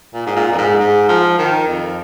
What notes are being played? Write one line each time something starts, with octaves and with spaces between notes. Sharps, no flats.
A#2
G#2
A#2
F2
G#2
G#2
F3
D#3
F2